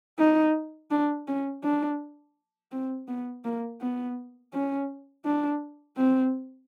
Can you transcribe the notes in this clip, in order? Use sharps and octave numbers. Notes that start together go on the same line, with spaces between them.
D#4
D4
C#4
D4
C4
B3
A#3
B3
C#4
D4
C4